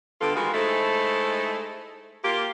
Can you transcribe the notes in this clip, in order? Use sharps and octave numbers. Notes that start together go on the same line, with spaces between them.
D3 G3 B3 F4 A4
D#3 E3 G#3 F4 F#4
G#3 A3 D#4 E4 A4 C5
A#3 F4 G4